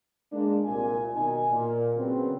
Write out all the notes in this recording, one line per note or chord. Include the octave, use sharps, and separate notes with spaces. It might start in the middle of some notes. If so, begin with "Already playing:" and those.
G#3 A#3 D4
C2 A#2 G#5
B2 D#3 D#4 A#4 G#5
A#2
C#3 F#3 B3 C4